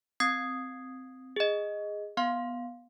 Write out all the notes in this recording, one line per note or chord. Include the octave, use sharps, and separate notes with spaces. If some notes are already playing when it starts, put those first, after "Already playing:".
C4 D#6 G#6 C7
G#4 D#5
B3 F5 C6